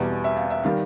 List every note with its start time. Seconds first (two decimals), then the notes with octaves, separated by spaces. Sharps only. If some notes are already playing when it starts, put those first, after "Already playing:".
Already playing: E2 B2 G3 D5
0.24 E5
0.37 F5
0.50 E5
0.64 D#3 G3 F5